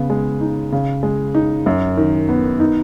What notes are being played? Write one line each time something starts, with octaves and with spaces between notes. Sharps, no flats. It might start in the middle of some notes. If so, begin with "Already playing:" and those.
Already playing: C#3 B3
G#3
D#4
C#3
G#3
D#4
F#2
D#3
B3
D#4